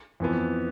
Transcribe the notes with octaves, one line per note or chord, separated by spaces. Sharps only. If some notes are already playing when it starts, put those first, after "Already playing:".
F2 E3 B3